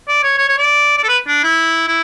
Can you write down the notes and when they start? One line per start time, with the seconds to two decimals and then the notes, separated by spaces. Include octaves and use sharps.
0.08 D5
0.23 C#5
0.38 C#5
0.49 C#5
0.58 D5
0.98 D5
1.04 A4
1.08 B4
1.28 D4
1.44 E4
1.88 E4